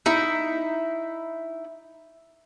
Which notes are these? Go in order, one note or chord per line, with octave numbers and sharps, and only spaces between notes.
D#4 E4 E5